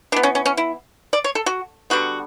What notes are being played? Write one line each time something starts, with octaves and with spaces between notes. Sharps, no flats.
E3 B3 D4
C#4
C#4
C#4
E4
D5
C#5
A4
F#4
D3 G3 B3 F#4